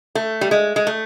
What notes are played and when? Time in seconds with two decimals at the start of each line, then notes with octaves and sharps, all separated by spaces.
0.15 A3
0.41 G3
0.51 G#3
0.76 G#3
0.87 A3